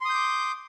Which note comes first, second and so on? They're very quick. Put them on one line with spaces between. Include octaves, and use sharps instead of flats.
C6 D#6 G6 D6